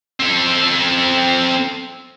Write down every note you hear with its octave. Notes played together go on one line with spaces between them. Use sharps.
C4 A4